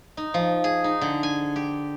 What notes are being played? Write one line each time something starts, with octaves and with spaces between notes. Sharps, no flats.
D#4
F3
G#4
D#4
D3
G#5
G4